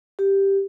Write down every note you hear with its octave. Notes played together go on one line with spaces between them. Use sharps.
G4